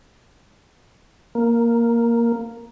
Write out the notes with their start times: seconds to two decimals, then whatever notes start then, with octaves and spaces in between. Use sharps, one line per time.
1.35 A#3